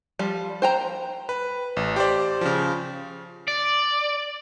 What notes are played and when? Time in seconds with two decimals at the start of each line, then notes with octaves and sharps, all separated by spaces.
0.19 F3 G3
0.62 C5 G5 A#5
1.29 B4
1.76 A1
1.96 G4 C5 D5
2.41 C#3 F3
3.48 D5